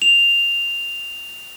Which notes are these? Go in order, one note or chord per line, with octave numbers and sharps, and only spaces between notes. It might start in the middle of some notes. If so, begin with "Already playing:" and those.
F7